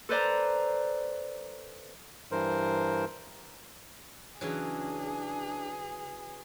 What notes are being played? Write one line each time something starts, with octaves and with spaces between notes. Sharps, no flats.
A4 B4 C5 D5 A#5
G2 E3 A#4 C5
C#3 E3 F#3 D4 G#4